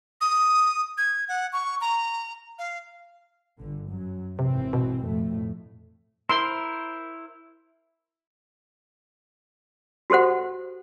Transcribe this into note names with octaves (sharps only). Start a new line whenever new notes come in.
D#6
G#6
F#5
C#6
A#5
F5
G1 D3
F#2 F#3
G#1 C3 E3 C4
B2
F2 A2 A3
E4 A#4 C5 C6
F#4 G4 A4 C5 F#5